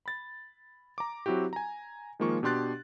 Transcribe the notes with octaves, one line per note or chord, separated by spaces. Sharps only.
B5 A6
A#5 D6
F#3 C4 E4 F#4 G4
G#5 A#5
D#3 F3 G#3 A#3 F4 C#6
B2 D4 G4 C6 F#6 A6